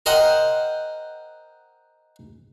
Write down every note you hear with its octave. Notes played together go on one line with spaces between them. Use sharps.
A#4 C5 D#5 F#5 G5